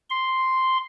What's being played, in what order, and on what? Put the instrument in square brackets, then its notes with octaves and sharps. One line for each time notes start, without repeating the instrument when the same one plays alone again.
[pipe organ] C6